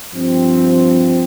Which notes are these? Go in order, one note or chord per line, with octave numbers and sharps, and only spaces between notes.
G2 F3 C4